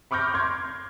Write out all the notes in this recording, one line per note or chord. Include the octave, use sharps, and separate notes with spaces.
B5 C#6 D6 F6 G6 A#6
C6 G#6